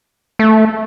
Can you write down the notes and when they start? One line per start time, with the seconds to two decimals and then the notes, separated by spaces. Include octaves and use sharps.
0.39 A3